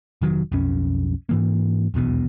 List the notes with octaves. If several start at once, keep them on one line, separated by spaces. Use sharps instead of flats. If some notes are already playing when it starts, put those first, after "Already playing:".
F1 D#3 F#3
B1 F2 C#4
G#2 E3 A#3
D#1 B1 E2 B2